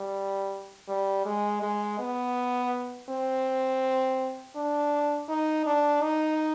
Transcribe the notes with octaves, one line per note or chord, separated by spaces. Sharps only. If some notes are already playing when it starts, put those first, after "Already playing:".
Already playing: G3
G3
G#3
G#3
B3
C4
D4
D#4
D4
D#4